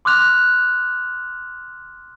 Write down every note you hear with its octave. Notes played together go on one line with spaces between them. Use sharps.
C6 D6 F6 F#6 F7